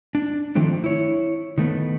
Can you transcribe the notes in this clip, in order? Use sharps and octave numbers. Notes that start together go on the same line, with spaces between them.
D4
D#3 F3 A3 C4 D4
E4 C#5
D#3 A3 B3